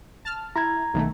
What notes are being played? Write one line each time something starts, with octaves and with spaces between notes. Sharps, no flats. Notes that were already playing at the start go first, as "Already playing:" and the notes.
A5 F6
E4 A#5 G#6
B1 D#3 A3